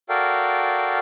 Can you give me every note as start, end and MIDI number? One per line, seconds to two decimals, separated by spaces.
0.09 0.99 66
0.09 0.99 69
0.09 0.99 70
0.09 0.99 74
0.09 0.99 77
0.09 0.99 79